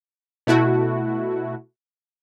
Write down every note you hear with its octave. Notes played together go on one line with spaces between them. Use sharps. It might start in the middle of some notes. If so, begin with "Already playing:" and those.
B2 A3 E4 F#4